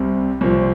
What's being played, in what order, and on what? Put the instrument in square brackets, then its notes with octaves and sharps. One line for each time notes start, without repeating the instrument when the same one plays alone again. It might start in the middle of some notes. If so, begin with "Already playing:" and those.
Already playing: [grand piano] C2 C3 G3 C4
C2 A#2 F3 C4